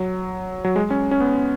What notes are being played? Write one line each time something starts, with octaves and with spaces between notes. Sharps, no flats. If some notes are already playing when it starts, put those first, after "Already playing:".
Already playing: F#3
F#3
G#3
C#4
C#4
B3